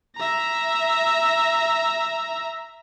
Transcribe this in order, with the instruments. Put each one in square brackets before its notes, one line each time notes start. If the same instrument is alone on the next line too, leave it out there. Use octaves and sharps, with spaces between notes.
[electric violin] E5 A#5